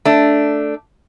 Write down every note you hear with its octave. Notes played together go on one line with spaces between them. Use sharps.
A3 D4